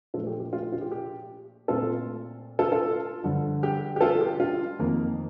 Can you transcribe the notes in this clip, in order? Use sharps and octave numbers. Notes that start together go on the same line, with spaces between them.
A#2 F3 A3 F4 A4
G4
G4
F4
F4
G4
G4
A#2 A3 C4 F4 A4
F4 A4
F4 A4
G2 D3 F3
G4
G4
F4 A4
G4
F4
F2 D#3 A#3